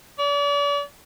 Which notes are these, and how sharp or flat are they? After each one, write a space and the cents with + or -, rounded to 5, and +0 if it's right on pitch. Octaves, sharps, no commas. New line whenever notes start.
D5 -40